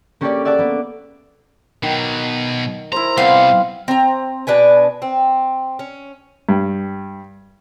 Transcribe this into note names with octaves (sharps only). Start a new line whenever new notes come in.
A#3 C#4 G4 A4 C#5 D5
D5 E5 F#5 A5 D6
A#3 B3
B2 D#3 F#3
E4 A#4 C5 A#5
C3 G3 B3 C4 F5
C4 A#5
B2 D4 B4 G#5
C4
C#4
G2